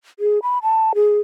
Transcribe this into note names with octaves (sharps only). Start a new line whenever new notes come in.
G#4
B5
A5
G#4